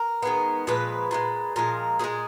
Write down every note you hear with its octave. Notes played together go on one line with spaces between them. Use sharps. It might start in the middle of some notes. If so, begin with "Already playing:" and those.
Already playing: A#4
D#3 G#3 B3
A#2 F3 G#3 B4
A#2 F3 G#3
A#2 F3 G#3 A#4
A#2 F3 G#3 G#4